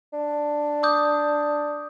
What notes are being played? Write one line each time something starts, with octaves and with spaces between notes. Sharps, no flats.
D4
D6 D#6 G6